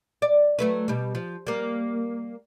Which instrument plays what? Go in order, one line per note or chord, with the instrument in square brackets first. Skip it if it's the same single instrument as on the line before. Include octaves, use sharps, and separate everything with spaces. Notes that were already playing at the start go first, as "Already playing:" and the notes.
[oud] D5
F#3 A3 B4
B2 G3
F3
G3 A#3